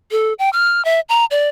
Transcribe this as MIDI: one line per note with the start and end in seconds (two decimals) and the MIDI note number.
0.11 0.33 69
0.39 0.50 79
0.53 0.84 89
0.85 1.00 76
1.09 1.25 82
1.31 1.49 74